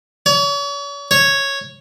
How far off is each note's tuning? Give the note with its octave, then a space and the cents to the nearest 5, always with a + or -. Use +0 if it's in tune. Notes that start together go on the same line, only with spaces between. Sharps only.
C#5 +40
C#5 -5